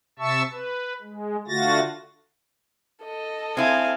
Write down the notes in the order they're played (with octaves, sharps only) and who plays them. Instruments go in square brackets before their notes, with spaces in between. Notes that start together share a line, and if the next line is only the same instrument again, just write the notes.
[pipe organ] C3 E5 A5 C#6 E6
B4
G#3
D3 A3 F4 F#4 A6 A#6
[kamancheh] A4 D#5
[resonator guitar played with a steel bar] C4 E4 [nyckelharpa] F5 G#5